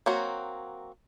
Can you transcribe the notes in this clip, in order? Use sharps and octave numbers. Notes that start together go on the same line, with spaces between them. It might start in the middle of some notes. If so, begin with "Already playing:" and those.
F#3 A#3 C4 F#4